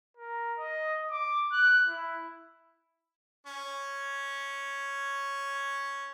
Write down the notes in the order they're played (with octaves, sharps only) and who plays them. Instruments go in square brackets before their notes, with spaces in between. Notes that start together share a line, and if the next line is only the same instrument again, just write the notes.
[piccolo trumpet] A#4
D#5
D6
F#6
E4
[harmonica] C#4 C#6